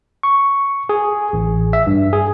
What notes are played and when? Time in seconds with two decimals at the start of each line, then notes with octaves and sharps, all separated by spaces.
0.23 C#6
0.89 G#4
1.33 A1
1.73 E5
1.87 G2
2.13 G#4